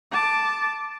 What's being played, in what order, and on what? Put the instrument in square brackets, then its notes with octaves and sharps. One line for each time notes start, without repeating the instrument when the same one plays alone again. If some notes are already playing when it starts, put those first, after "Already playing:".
[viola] A5 D6